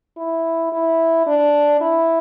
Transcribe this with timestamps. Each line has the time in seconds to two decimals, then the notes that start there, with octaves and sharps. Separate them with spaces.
0.18 E4
0.72 E4
1.26 D4
1.81 E4